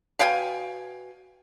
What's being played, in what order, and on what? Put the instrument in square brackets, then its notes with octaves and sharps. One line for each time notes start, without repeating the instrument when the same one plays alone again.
[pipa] B2 F5 G5 G#5